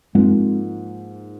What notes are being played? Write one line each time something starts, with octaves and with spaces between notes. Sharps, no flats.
G#2 F3 G#3 A#3 C4